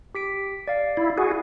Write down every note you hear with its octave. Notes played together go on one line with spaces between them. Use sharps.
G4 B6 D7
D5 F5
E4
F#4 G#4